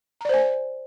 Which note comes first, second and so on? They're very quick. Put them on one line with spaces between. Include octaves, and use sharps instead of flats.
A#5 D5 C5 G#5